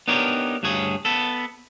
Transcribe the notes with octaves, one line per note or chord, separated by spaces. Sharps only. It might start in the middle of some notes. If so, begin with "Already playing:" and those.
B3 D4 D#4 G4 A#4 C#5
D2 G2 F#4 G#4 C#5
B3 A4